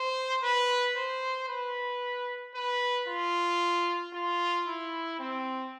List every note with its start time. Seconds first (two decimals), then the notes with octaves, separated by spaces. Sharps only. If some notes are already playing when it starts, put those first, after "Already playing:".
Already playing: C5
0.43 B4
0.96 C5
1.48 B4
2.55 B4
3.08 F4
4.13 F4
4.67 E4
5.19 C4